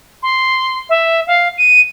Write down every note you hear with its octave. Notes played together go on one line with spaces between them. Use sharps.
C6
E5
F5
D#7